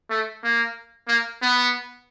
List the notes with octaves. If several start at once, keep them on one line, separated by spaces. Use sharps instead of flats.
A3
A#3
A#3
B3